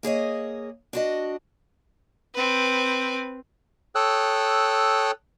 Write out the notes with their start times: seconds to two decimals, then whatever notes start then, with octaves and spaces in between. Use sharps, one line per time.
0.03 A#3 G#4 C#5 D#5
0.93 D4 F#4 D#5
2.34 C4 B4
3.95 A4 C#5 G5 D#6 E6 F#6